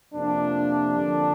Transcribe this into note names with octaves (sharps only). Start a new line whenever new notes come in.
F2 C3 F3 A#3 D4
F2 D3 F3